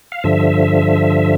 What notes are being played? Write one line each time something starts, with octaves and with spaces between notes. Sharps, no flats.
F5
G2 D3 F3 E5